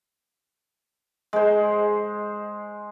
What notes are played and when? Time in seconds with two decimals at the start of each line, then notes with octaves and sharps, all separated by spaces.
1.33 G#3 C5